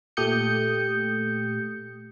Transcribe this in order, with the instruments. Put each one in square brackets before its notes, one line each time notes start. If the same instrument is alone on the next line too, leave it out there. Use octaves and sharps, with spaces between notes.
[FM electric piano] A#2 A3 G4 D#6 G6 C#7